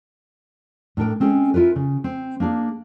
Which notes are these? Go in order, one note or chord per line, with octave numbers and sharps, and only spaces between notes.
A2 D4 A#4 G5
G#3 C4 C#4 G#4
E4 F4 A#4 B4
C#3
C4
A#3 D4 G#4 F5